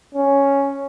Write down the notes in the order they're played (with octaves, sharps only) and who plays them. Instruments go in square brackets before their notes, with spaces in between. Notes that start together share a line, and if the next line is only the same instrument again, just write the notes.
[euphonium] C#4